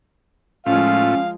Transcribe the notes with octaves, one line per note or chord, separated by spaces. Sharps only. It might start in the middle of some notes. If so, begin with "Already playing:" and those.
A2 F3 G#3 C#4 F4 F5